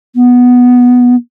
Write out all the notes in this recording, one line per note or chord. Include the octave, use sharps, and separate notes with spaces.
B3